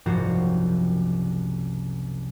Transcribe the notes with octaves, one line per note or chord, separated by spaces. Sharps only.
F#1 C2 G#2 F3 F#4 C5